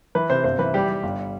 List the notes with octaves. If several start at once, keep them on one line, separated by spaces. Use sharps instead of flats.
E3 B4
C3 C5
G1 C5
E3 B4
G3 G4
G3
G1